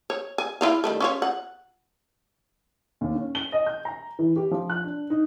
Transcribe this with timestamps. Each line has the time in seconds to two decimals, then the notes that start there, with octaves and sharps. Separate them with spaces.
0.10 C#5
0.38 G#5
0.61 E4 F4 F5
0.84 D#3 G3 A3
1.00 C#4 F4 C#5
1.22 F#5
3.01 D#2
3.15 C#4
3.35 G7
3.52 D#5
3.66 G6
3.85 A#5
4.19 E3
4.36 G4
4.51 F3
4.70 F#6
4.84 D4
5.10 D#4